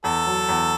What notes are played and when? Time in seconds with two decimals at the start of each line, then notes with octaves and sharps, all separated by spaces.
0.04 E2 A4
0.26 F#3
0.49 E2